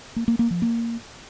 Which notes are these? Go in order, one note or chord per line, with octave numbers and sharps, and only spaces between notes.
A#3
A#3
A#3
F3
A#3